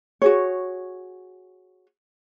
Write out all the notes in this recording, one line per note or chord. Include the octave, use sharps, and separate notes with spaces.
F#4 G#4 C#5